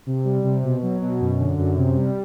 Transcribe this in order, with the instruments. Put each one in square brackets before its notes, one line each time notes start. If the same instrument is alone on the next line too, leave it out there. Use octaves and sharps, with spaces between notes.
[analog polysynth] C3
G3
C3
B2
F#3
B2
F#2
D3
F#2
C3
G3